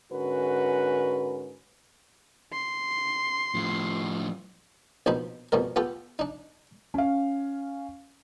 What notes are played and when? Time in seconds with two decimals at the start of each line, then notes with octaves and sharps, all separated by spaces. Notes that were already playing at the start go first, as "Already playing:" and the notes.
0.12 G#2 D3 C#4 F#4 A#4 B4
2.53 C6
3.54 A2 F3
5.06 A#1 B2 D#4 C5 B5
5.52 F2 B2 G3 A#4
5.76 B3 F4 G4 A4
6.19 D4 D#4
6.94 C#4 F5